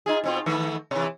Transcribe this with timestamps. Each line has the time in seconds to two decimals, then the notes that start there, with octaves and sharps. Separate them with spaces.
0.06 D#4 F4 G#4
0.24 B2 C4 F4
0.46 D#3 A3 B3
0.91 C3 E3